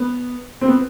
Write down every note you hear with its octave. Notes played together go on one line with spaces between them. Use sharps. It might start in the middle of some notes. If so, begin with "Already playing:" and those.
Already playing: B3
C4
B3